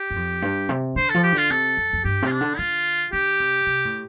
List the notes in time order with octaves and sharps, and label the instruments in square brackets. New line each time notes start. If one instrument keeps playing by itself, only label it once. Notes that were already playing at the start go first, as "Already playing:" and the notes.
Already playing: [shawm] G4
[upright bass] G2
F2
G2
C3
[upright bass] D3 [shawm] C5
[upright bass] F3 [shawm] A4
[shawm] G4
[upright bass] D3
[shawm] F4
[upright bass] C3 [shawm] A4
[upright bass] F2
F2
[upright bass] G2 [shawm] G4
[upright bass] C3 [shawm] F4
[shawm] D4
[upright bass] D3
[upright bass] D3 [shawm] F4
[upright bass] D3 [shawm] G4
[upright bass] C3
C3
A2